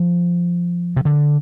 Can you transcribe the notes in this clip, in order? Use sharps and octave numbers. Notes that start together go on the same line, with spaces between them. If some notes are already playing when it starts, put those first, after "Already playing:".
Already playing: F3
C3
D3